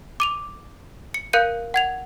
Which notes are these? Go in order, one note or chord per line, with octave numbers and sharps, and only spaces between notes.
D6 D#7 F7
C#7
A#4 F5 F#6 G6 C#7 D#7
F#5 G#6 F7